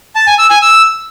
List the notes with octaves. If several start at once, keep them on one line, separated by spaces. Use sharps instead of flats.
A5
G#5
E6
G#5
E6